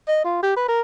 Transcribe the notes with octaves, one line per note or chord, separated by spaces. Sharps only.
D#5
F4
G4
B4
A#4